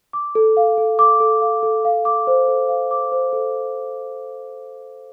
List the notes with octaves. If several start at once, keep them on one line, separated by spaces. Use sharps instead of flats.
D6
A4
F5
A4
D6
A4
F5
A4
F5
D6
C5
A4
F5
D6
C5
A4